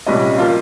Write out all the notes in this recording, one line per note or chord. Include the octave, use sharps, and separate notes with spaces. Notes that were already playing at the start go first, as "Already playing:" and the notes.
C2 A#2 G3 C#4 D#5
F3 A#3 F4